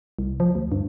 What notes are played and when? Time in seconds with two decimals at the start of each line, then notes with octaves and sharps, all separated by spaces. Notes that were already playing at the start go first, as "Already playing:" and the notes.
0.19 C2
0.40 F3
0.55 D2
0.72 G2